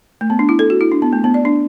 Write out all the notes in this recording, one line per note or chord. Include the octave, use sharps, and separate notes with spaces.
A3
B3
D4
E4
A4
F#4
E4
D4
B3
A3
B3
D5
D4